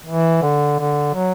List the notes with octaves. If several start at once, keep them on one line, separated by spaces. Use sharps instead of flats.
E3
D3
D3
F#3